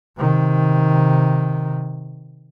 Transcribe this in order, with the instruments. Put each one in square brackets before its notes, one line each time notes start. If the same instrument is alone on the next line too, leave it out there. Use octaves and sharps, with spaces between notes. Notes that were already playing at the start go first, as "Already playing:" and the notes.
[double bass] C3 D#3